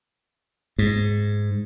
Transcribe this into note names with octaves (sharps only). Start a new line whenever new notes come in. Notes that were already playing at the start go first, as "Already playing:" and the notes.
G#2